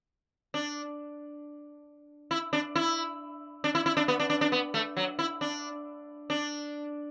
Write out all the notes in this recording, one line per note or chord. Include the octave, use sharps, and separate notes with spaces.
D4
E4
D4
E4
D4
E4
E4
D4
B3
D4
D4
D4
B3
A3
F#3
E4
D4
D4